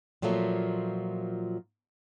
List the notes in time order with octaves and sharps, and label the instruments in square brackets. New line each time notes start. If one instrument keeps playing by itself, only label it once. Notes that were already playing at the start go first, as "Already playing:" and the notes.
[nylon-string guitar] A#2 F3 F#3 A3 A#3